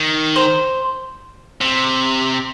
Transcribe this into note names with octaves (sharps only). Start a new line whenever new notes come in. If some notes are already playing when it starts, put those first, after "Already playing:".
Already playing: D#3
C5
C3